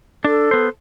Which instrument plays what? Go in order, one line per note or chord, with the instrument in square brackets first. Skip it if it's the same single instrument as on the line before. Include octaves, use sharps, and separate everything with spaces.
[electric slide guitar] D4 [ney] A4
[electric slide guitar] B3 C5